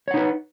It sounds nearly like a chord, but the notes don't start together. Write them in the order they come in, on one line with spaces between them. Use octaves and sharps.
C#5 F#5 D#4 B4